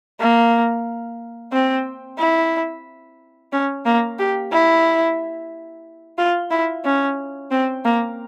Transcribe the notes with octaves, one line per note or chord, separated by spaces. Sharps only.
A#3
C4
E4
C#4
A#3
G4
E4
F4
E4
C#4
C4
A#3